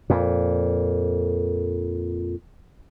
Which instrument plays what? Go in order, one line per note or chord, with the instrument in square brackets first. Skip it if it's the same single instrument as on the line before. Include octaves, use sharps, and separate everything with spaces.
[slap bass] F2 A#2